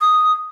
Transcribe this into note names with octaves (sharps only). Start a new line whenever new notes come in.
D#6